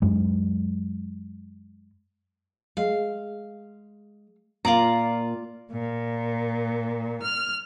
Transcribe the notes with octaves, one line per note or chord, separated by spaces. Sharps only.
F#2 G#3
G#3 F5
A#2 A#3 F4 D5 A#5
A#2
F6